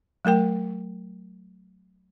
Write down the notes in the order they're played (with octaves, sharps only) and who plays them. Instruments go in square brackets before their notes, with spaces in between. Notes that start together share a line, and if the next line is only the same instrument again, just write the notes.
[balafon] F#3 A3 A#4 G5